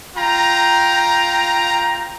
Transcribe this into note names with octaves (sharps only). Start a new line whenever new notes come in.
F4 G5 A#5